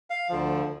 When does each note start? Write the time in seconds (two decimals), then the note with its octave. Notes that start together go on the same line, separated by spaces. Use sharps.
0.10 F5
0.29 D2 D3 F3